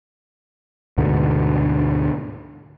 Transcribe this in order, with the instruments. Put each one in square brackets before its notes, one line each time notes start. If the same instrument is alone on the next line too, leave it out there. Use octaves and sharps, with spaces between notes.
[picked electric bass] D2 G#2 B2 D3